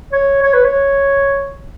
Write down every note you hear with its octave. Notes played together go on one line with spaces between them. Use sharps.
C#5
C#5
B4
C#5